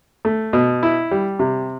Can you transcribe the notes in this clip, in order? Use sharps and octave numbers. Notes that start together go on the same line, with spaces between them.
A3
B2
E4
G3
C3